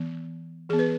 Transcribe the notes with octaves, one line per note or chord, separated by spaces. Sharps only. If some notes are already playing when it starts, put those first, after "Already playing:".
Already playing: E3 B3
E3 B3 G#4
B4